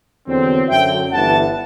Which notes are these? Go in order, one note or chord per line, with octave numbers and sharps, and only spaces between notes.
E2 D3 F#3 C4
F#2 D3 F#3 E5 G5
G1 G2 E3 F#5 A5